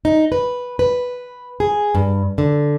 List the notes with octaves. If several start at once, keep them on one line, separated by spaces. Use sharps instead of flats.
D#4
B4
B4
G#4
G2
D3